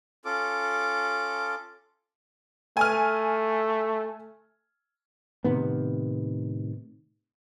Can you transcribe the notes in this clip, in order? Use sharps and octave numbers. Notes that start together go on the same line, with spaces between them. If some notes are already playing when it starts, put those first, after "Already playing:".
C#4 F4 A4 D6
A3 G#5 F6
A2 C3 D#3 B3